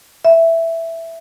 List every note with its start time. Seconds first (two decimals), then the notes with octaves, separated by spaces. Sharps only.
0.25 E5